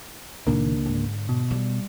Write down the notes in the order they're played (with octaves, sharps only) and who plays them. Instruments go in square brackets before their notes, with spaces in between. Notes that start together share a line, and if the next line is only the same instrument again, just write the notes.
[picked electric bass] C#2 A#3 D4 [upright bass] A#2 D#3
[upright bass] G#2 D3
[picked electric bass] B2
[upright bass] G3